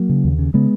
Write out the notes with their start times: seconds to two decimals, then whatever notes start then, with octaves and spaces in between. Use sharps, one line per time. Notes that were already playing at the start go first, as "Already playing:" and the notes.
Already playing: F#3 A#3
0.09 C#3
0.24 D#2
0.39 C#3
0.54 C#3 G#3 B3